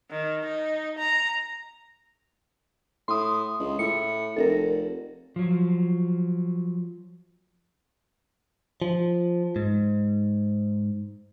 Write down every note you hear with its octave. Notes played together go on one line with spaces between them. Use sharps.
D#3
D#4
A#5
A2 C6 D#6
C#2
A2 C#7
F1 A4 A#4
F3 F#3
F3
G#2